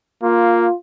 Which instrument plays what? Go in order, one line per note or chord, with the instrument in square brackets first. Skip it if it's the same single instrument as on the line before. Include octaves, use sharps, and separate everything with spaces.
[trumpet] A#3 [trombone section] F4